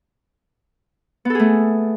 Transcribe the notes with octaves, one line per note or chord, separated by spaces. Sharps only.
A3 B3 G#4 A4